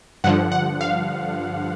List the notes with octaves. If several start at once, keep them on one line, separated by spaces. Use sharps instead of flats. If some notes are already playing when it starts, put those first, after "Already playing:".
G2 D3 F3 F#5
F#5
F5